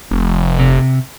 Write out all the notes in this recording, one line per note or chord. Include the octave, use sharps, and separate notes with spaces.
F1
C3